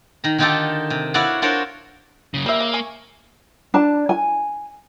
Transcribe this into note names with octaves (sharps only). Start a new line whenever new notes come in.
D#3 A#5
D3 D#3 D#4 F4 G4 A4
C3
E4 F#4 C#5 D5 F5 F#5
D4 F4 F#4 A#4 C5 C#5
F#2 C#3
G3 A#3 E5
C#3
G#5 C#6
D4 A5
G#5